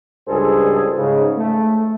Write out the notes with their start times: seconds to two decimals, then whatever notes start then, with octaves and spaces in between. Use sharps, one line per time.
0.28 C#2 G2 G#4 A4 C5
0.97 G#2 C#3
1.37 A3